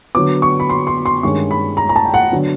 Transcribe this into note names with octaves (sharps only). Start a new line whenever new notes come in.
D3 F#3 B3 D6
C#6
B5
C6
C6
C6
G2 D#3 G#3 C#4 C#6
B5
A#5
A#5
A5
G5
F#5
D3 F#3 B3 D4